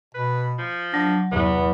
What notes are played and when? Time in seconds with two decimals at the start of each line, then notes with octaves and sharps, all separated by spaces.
0.15 B2 B4
0.59 F3
0.94 F#3 D4
1.32 E2 C3 B3